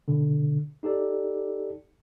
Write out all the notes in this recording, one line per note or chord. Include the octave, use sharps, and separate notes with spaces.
B2 D3
D#4 G4 A4 D5